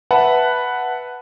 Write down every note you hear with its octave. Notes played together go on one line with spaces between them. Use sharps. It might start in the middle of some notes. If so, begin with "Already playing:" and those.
B4 E5 F#5 A5 B5